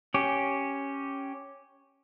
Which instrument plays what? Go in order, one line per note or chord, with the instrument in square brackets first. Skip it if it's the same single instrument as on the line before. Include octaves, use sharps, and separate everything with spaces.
[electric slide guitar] C#4 G4